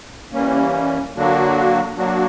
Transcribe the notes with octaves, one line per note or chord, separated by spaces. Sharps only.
E3 G3 A#3 C#4
D3 F#3 A#3 D4 F#4
F#3 A#3 D4 F#4